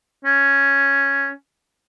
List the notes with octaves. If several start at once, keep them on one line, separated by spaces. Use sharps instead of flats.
C#4